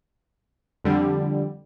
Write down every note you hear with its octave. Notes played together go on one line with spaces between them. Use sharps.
F2 D3 G3